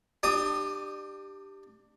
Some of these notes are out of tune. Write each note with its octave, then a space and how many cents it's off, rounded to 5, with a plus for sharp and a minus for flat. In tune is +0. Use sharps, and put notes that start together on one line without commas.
D4 +30 G4 +0 D#6 +0